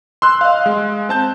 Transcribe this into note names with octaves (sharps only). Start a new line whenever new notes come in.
C6 E6 F#6
D#5 F5
G#3
C4 A5 G6